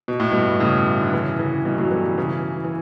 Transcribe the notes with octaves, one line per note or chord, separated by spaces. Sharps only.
B2
A2
G2 B2
A2 C#3
D3
C#3 E3
C#3 E3
G2 B2
F#3 A3
E3 G3
C#3 E3
E3